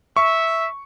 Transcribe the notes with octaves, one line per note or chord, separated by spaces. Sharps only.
E5 C#6